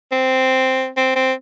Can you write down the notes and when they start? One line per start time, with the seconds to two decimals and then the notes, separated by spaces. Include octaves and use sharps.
0.12 C4
0.97 C4
1.16 C4